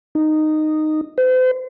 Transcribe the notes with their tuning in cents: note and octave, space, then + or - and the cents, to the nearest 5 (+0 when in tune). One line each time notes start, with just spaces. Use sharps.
D#4 -10
C5 -40